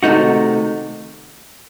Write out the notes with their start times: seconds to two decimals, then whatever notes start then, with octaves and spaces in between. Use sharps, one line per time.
0.03 C3 D#3 A3 D#4 F#4